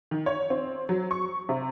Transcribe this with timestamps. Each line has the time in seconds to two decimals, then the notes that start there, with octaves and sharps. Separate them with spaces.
0.11 D#3
0.26 C#5
0.50 C4
0.89 F#3
1.11 C#6
1.49 C3